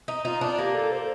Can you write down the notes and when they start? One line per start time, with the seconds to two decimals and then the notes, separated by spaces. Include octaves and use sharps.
0.08 D#4
0.25 D#4 F4
0.41 D4
0.58 A#3 G4
0.74 A4
0.92 C5